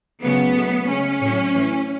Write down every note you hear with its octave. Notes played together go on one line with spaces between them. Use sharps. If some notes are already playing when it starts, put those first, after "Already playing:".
C#3 F#3 A3 B3
B2 F#3 A3
C#3 G#3 C#4
A2 F#3 A3
A2 E3 A3